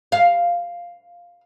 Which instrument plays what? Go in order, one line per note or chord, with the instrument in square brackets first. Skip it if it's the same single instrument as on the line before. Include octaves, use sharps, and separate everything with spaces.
[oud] F5